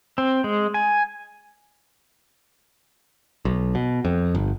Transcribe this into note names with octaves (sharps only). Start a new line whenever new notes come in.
C4
G#3
G#5
B1
B2
F2
G1